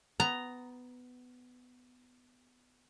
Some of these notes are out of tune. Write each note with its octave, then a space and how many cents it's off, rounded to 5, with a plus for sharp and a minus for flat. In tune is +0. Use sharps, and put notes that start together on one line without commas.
B3 +15 A#5 +0